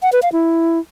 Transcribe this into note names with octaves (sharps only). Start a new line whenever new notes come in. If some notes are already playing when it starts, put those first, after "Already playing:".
F#5
B4
F5
E4